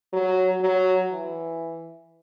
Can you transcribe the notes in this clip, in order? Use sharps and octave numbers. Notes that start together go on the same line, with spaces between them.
F#3
F#3
E3